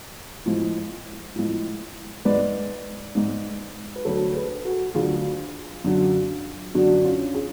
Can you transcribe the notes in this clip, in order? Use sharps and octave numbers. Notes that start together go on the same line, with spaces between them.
A2 F3 G#3
A2 F3 G#3
G#2 G#3 B4 D5
G#2 G#3
B4
D2 D3 F#3 A4 C#5
G#4 B4
F#4 A4
F#4
D2 D3 F#3 F4 G#4
F#2 D3 F#3
F#2 D3 F#3 D4 F#4
C#4 F4
F4 G#4